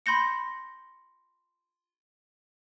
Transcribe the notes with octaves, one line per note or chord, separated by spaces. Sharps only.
B5 C6 G6 A#6 C#7